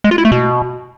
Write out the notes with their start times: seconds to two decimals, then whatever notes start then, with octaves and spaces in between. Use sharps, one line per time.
0.04 G#3
0.11 F4
0.18 E4
0.25 A3
0.32 B2